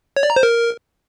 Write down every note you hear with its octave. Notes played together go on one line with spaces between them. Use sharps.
C#5
D5
A#5
C5
A#4